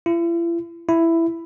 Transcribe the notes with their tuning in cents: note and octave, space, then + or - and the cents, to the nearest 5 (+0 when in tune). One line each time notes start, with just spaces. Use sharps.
E4 +45
E4 +10